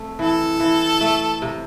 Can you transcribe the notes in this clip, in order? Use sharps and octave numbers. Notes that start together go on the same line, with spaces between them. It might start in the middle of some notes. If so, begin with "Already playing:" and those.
Already playing: A3 C4
E3 A4
E3
A3
C3